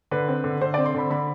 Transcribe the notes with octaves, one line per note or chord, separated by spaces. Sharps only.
D3 B4
C4
D3
D3 C5
C4 D5
C6
D3 B5
D3 B5